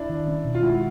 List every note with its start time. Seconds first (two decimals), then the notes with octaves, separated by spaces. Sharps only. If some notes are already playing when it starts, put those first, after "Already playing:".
Already playing: D4 E4
0.09 D#3
0.28 C#4
0.45 B2
0.55 F4
0.63 G#3 E4 F#4